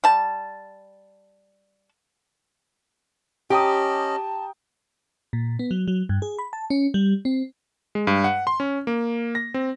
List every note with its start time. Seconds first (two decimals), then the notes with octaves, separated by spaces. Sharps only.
0.04 G3 A5
3.50 C#4 G4 D#5 G5 A5 A#5 D#6
5.33 A#2
5.59 B3
5.71 F#3
5.88 F#3
6.09 G2
6.22 G#4
6.39 B5
6.53 A5
6.70 C#4
6.94 G3
7.25 C4
7.95 G#3
8.07 G2
8.24 F#5
8.47 C6
8.60 C#4
8.87 A#3
9.35 A#6
9.54 C4